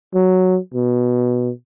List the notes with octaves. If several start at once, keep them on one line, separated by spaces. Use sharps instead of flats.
F#3
B2